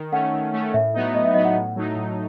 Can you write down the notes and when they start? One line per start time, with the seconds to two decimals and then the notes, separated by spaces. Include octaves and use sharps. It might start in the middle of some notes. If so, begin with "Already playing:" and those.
Already playing: D#3
0.12 A3 C#4 F#5
0.33 D#3
0.53 A3 C#4
0.74 A2 E5
0.94 F#3 B3 D#4
1.15 A2 D#5
1.25 E5
1.34 F#3 B3 D#4 D#5
1.45 F#5
1.55 A2
1.76 F#3 A3 D#4
1.96 A2